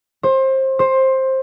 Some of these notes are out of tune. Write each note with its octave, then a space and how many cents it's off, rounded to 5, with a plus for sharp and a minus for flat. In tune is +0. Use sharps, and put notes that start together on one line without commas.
C5 +25
C5 +15